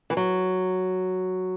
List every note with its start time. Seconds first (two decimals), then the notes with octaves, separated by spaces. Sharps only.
0.10 E3
0.17 F#3